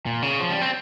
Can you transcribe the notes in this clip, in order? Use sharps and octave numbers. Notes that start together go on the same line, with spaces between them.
A#2
C#3
F3
G3
C4